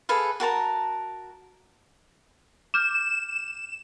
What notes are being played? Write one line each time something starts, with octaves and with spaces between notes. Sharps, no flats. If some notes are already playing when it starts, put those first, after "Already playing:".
G#4 A4 B4 F5
F#4 A#4 A5 A#5
D6 F6 G6 E7